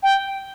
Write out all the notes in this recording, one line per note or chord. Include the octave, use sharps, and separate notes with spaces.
G5